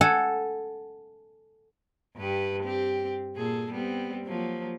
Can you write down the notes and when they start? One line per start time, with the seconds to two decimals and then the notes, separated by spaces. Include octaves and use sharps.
0.01 A4 F#5 G#5 A5
2.16 G2 G4 B4
2.63 C4 G4
3.36 A#2 G#4 A4
3.71 G3 B3 C4
4.26 F3 F#3 A#3